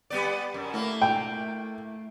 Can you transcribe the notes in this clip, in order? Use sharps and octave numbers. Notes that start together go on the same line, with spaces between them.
G3 B3 D5
F#2
A3 A#3 E4
G5